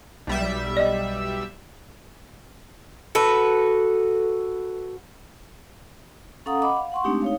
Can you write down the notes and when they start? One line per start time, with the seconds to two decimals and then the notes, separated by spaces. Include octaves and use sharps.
0.27 B1 G3 E5
0.77 D5 D#5
3.15 F#4 A4 B4
6.46 C#4 A4 F5 F#5 A#5 D#6
6.62 D#5 F#5 B5 D6
6.77 F5
6.92 F#5 C6 C#6
7.04 G#3 A3 C4 D4 D#4 G4
7.22 D#4 C#5 F5